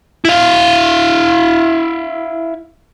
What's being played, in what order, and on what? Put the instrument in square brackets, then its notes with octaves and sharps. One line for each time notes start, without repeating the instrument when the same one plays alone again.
[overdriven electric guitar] E4 F5